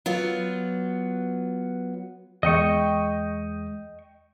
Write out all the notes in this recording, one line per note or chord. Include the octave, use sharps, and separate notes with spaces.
F#3 B3 F4
E2 G#3 D#5 G5 C#6